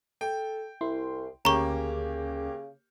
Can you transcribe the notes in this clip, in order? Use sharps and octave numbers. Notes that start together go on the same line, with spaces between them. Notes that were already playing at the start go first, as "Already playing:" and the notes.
A4 G5
C2 E4 C6
D2 C#3 A#3 C#4 G4 G#4 A#5 C#6